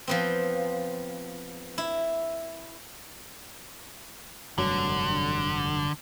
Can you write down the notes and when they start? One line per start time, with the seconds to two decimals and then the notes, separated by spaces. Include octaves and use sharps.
0.08 F3 B3 C4
1.78 E4
4.58 F1 G2 D3 F#3